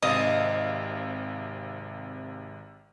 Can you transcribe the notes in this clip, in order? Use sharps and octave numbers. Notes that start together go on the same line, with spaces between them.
G#1 C3 D#5 F5